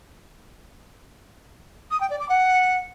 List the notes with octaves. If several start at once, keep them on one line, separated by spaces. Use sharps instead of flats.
D#6
G5
D5
D6
F#5